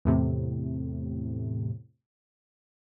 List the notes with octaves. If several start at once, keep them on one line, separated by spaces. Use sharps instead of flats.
E2 A2 C3